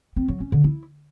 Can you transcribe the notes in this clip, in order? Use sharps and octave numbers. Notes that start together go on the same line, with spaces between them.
C4
F#3
C#4
D3
E4